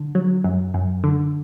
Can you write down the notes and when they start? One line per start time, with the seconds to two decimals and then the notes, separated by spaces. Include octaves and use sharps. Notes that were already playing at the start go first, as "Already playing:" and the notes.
Already playing: D3
0.15 F#3
0.44 F#2
0.74 F#2
1.04 D3